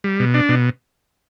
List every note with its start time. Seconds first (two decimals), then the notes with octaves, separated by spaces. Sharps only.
0.04 G3
0.20 B2
0.34 D4
0.49 B2